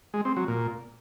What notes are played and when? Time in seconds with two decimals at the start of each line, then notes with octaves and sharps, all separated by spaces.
0.14 G#3
0.25 C4
0.36 F#3
0.48 A#2